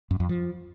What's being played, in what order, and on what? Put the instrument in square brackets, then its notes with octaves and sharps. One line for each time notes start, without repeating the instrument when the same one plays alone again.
[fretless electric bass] F#2
F2
F3